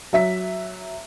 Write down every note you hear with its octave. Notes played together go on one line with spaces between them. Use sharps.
F#3 E5 B6